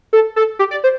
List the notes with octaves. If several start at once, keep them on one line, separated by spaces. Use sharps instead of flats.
A4
A4
G4
D5
C5